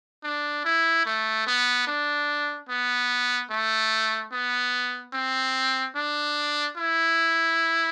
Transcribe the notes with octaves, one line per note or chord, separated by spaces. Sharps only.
D4
E4
A3
B3
D4
B3
A3
B3
C4
D4
E4